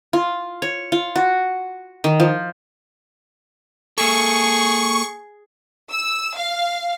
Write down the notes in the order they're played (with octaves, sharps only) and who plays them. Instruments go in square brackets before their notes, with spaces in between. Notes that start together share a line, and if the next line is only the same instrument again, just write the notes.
[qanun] F4
C#5
F4
F#4
D#3
F3
[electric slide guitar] A#3 A4 [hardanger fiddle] G#4 [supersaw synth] C#6
[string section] E6
F5